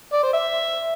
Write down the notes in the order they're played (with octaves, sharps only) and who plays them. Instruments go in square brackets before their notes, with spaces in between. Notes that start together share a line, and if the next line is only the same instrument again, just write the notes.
[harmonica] D5
C5
E5